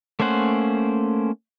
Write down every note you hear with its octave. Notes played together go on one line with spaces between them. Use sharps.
A3 A#3 C#4 C5 F#5